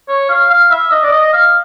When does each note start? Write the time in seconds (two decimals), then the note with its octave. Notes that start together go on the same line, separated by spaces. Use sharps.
0.08 C#5
0.29 F5
0.50 F5
0.71 E5
0.91 D#5
1.03 D5
1.12 D#5
1.33 F5